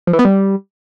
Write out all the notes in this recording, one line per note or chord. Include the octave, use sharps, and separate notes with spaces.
F3
E3
B3
G3